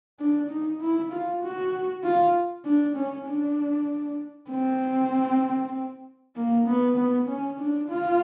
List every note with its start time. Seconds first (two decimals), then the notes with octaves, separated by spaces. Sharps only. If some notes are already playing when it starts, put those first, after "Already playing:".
0.19 D4
0.50 D#4
0.81 E4
1.12 F4
1.42 F#4
2.04 F4
2.65 D4
2.96 C#4
3.27 D4
4.50 C4
6.36 A#3
6.67 B3
6.97 B3
7.29 C#4
7.59 D4
7.89 F4